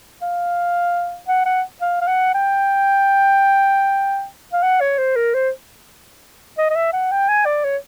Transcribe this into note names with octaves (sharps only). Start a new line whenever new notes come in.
F5
F#5
F#5
F5
F5
F#5
G5
F5
F#5
C#5
C5
A#4
C5
D#5
D#5
E5
F#5
G5
G#5
D5
C#5